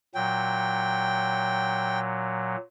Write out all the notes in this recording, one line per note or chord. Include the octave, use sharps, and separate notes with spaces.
A#2 F#3 G5